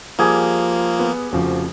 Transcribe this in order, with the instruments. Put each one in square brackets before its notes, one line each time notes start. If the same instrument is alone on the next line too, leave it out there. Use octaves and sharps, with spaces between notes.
[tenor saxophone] F3 [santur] G3 G#4 [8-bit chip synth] A#3
[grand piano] B3
[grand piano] F1 C#3 F3 [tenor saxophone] F#4